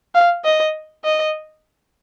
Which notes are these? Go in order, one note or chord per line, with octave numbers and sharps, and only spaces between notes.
F5
D#5
D#5